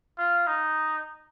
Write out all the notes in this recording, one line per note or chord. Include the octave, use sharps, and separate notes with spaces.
F4
D#4